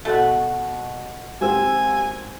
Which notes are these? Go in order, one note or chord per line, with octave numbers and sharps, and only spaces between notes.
B2 A3 F#4
G#1 C4 G4 G#5 E6